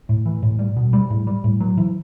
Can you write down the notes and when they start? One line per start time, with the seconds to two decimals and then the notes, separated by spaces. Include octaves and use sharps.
0.09 A2
0.26 E3
0.43 A2
0.59 G3
0.76 B2
0.93 G3
1.10 A2
1.27 G3
1.44 A2
1.60 F#3
1.77 E3